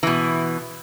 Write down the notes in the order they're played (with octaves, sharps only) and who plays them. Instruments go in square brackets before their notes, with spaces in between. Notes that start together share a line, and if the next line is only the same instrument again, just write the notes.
[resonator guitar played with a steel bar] B2 E3